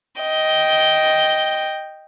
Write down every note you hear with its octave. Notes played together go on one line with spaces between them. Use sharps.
D#5 G5